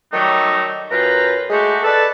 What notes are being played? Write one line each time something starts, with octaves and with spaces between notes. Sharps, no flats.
D#3 F#3 G3 A3 D#4
F#2 F4 B4 G5 A#5
G#3 A3 F#4 G4
A4 B4 D5 A5